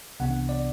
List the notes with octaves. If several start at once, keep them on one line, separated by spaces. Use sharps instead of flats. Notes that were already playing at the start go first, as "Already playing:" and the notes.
C2 C3 E3 B3 D4 F#5
D5